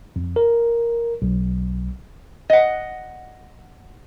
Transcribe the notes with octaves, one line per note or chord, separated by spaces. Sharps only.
F2
A#4
B1
D#5 F#5